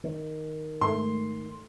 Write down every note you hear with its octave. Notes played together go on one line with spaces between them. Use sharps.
D#3
G#2 A3 C6